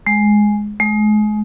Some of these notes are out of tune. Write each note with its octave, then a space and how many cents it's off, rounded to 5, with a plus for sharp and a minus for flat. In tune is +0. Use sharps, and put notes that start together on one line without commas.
G#3 +5
G#3 +35